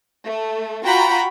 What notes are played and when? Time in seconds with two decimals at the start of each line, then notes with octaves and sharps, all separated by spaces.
0.25 A3
0.85 F4 F#4 F#5 G5 A#5 B5